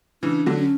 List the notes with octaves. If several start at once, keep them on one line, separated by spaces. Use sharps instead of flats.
C#3 E3 D4
D3 F#3
C#4